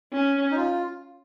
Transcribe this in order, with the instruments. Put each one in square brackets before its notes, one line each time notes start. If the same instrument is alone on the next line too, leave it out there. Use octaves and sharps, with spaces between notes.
[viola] C#4
[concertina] D#4
F4